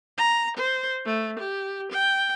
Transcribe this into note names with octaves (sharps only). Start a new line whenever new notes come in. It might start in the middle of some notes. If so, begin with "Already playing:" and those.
A#5
C5
A3
G4
G5